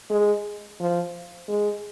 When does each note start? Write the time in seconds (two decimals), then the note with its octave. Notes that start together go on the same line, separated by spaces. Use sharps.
0.10 G#3
0.80 F3
1.48 G#3